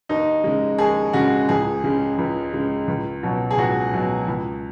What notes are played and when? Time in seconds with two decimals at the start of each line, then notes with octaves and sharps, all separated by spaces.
0.09 D#2 D#4
0.44 C#3 G#3
0.78 D#2 G#4
1.13 C#3 G#3 F#4
1.49 C#2 G#4
1.84 C#3 G#3
2.18 C#2
2.53 C#3 G#3
2.88 C#2
3.23 B2 F#3
3.51 G#4
3.58 C#2 F#4
3.93 B2 F#3
4.28 C#2